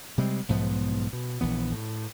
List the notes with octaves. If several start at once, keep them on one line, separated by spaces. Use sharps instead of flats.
C3 G3 G#3 C4
B1 G#2 F3 B3
B2
A#1 E3 B3
A2